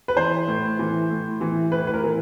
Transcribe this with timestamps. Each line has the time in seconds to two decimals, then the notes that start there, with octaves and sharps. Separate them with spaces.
0.08 B4
0.16 E3 C5
0.48 A2
0.79 E3
1.10 A2
1.41 E3
1.72 A2 B4
1.87 B4
1.94 A#4
2.04 E3